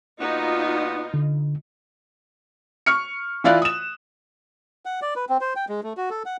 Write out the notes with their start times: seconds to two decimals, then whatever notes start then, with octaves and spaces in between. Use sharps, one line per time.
0.20 A#2 B3 D#4 F4 F#4
1.14 D3
2.86 C#6 F6 C#7
3.44 E3 E4 F4 D5 F5 F#6
3.62 D#6 E7
4.85 F#5
5.02 D5
5.16 B4
5.29 C4
5.41 C5
5.56 G5
5.69 G#3
5.83 A3
5.97 F#4
6.10 A4
6.26 F#5